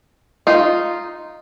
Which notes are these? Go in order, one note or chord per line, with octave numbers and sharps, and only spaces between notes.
D#4 F4